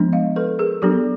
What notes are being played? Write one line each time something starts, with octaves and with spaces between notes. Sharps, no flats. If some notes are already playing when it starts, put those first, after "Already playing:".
Already playing: F3 G#3 B3 D4
D#5 F5
A4 B4
G#4 A#4
F#3 B3 D4 G4 A4